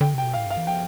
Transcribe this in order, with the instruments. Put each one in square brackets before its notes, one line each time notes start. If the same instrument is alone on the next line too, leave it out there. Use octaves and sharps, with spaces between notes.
[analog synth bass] D3 [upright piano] G5
[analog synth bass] C3
[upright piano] G5
[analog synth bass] B2
[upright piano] F5
[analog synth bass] A2
[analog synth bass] G2 [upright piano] F5
[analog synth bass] E3
[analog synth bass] F3 [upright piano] G5